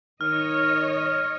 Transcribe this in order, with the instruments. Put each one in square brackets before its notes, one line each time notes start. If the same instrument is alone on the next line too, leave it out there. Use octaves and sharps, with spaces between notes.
[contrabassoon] D#3 [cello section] C#5 D#5 [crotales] F6